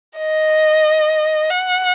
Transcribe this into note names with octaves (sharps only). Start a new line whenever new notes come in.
D#5
F#5